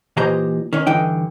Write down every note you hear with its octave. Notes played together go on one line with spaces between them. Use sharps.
A#2 E3 G4 C5 D#5 A#5
D#3 C#4
G2 D3 E3 D#4 G5